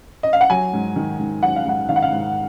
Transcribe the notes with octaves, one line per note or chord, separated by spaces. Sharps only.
D#5
F5
F#5
F#3 G#5
G#2
D#3
G#2
F#3 F#5
F5
G#2 F#5
D#3 F5
F#5
F5
G#2